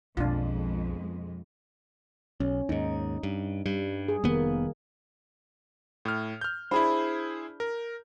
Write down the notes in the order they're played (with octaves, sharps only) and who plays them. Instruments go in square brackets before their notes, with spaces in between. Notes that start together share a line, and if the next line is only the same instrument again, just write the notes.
[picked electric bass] B1 [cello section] F2 G#3 [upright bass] B2 [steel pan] D4 F4
[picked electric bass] B1 [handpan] C#4
[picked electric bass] D#2 G#2 [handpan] D#4
[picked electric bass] G2
[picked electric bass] G2 [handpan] G3
[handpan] G#4
[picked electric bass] F1 B3 [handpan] D#3 A#3
[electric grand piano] A2 F6
F6 G6
[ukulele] D4 B5 [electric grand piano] E4 G#4 C5
[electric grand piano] A#4